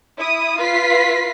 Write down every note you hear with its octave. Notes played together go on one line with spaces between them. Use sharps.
E4 D#6
F4 B4 B6 C7